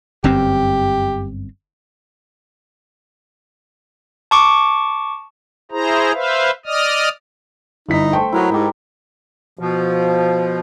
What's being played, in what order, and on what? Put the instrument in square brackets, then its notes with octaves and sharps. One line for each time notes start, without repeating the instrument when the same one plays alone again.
[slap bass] G1 F#2 C4 [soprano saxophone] G4
[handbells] A5 C#6 D6
[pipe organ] E4 G#4 C5 A#5
B4 C5 E5 F5
D5 D#5 D#6 F6
[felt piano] G1 E4 B6 [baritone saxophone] D#4
[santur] A3 C5 C#6 [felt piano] G5
[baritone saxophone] F#3 [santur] E4 A#4 D#5
[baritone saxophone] G#2 [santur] D#4 G4
[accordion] B2 F3